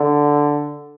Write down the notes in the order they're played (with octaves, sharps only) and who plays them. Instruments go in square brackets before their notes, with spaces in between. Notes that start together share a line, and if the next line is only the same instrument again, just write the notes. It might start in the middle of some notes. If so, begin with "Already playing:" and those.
Already playing: [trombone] D3